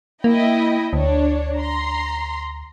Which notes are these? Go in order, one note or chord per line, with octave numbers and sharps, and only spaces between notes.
A#3 E4 D#5 G5
D2 D4 C#5
A#5 C6